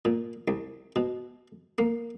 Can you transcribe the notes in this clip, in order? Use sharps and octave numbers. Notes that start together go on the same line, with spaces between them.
A#2
C2
B2
A#3